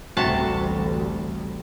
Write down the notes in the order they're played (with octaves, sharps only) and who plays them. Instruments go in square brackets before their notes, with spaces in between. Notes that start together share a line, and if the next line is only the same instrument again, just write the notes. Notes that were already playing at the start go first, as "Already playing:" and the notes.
[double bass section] A1 D2 G3 [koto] C3 F#4 A5